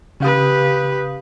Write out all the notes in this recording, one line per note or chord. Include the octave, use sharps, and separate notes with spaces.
C#3 G4 B4 F5 D#6